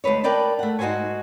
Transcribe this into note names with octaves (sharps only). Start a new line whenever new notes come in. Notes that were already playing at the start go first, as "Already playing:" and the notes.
D2 G#3 B4 C#5
A#4 B4 D5 G5 A5
A3 F#5
G#2 D#4 F#4 A4 C5 G#5